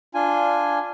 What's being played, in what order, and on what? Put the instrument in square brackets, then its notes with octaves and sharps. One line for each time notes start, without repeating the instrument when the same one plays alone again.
[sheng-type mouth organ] D4 F4 G#5